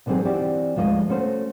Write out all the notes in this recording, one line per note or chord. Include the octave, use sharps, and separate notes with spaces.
B2 D3 D#3 F#3 C4 G#4
E3 C4 D4 F#4 G4 D5
D2 F3 G#3 C#5 D#5
A3 C#4 F#4 C5